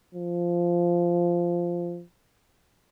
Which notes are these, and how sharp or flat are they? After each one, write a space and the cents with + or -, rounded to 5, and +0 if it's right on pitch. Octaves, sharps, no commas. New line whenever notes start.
F3 -10